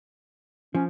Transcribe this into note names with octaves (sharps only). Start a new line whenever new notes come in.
F3 C#4